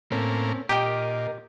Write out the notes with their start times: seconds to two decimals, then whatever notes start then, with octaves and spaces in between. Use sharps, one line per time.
0.12 A2 A#3 C4 C#4
0.69 A#2 G4 A#4 D#5 G5